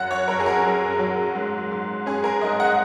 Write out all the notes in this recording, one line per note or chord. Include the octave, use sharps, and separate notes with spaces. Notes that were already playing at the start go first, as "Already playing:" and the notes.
Already playing: F#2 F#5
C#5
F#2 A#4
G#4
A#4
F#3
F#3
G#2
G#2
C#4 G#4
A#4
G#2 D#5
F#5